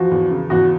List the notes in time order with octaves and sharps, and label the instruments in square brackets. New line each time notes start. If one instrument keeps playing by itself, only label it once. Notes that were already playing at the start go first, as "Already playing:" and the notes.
Already playing: [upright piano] E2 F3 [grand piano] F#4
[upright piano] E2
C#3
[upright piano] E2 [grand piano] F#4